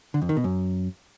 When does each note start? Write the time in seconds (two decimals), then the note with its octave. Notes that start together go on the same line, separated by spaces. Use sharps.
0.14 D3
0.22 F2
0.29 D#3
0.37 B2
0.44 F#2